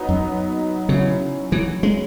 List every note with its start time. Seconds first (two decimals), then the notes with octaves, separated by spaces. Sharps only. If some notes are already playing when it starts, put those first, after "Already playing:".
Already playing: F#3 B3 D#4
0.09 F#2
0.88 C#3 F#3 C#4 E4
1.52 E3
1.83 G#3